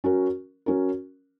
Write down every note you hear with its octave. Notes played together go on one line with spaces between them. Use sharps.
F#3 C#4 F#4 A#4
F#3 C#4 F#4 A#4